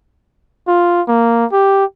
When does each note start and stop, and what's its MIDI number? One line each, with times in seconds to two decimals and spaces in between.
0.68 1.02 65
1.08 1.45 58
1.52 1.85 67